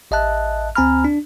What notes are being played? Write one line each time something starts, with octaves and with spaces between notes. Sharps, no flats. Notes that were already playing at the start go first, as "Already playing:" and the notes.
A1 D#5 E5 A5 F#6
D2 C4 G#5 A#5 B5 F6
D4